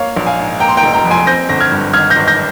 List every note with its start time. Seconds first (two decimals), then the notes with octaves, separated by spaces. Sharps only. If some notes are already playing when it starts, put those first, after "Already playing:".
Already playing: A#3 C#5 F5
0.16 A#1
0.27 F5 G#5
0.39 G#2
0.60 A#3 G5 A#5
0.69 C6
0.77 G5 A#5
0.83 F1
0.93 G5 A#5
1.05 F2
1.11 G#5 C6
1.27 C4 G6 A#6
1.49 G1 A#6
1.60 F6 G#6
1.71 G2
1.93 G#1 F6 G#6
2.10 G6 A#6
2.16 G#1
2.27 G6 A#6